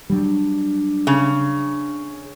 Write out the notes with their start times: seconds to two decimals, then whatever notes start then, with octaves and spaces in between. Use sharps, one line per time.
0.10 F#3 G3 D4
1.07 C#3